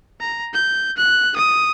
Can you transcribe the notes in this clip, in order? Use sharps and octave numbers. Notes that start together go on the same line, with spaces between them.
A#5
G6
F#6
D#6